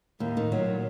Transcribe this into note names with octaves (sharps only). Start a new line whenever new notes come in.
D#2 A2
D#3
A#2 F#3